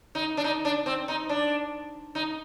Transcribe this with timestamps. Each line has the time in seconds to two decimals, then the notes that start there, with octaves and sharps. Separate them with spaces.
0.15 D#4
0.37 D4
0.44 D#4
0.65 D4
0.86 C4
1.08 D#4
1.29 D4
2.15 D#4